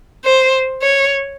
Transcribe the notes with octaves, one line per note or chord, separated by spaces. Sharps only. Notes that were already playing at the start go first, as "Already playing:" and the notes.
C5
C#5